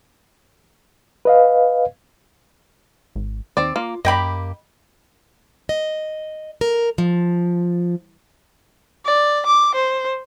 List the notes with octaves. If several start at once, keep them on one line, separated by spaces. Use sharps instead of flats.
B4 D#5 F5
G#1
D#2 C4 D5
A#3 F4
F#2 A#3 G4 D#5 G5 B5
D#5
A#4
F3
D5
D6
C5